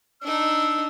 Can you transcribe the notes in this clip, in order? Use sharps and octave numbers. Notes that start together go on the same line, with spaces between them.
D4 D#4 E6